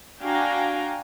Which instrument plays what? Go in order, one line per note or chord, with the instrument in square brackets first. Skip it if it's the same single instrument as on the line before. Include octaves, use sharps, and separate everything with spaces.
[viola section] D4 F#4 F5 G5 G#5 A#5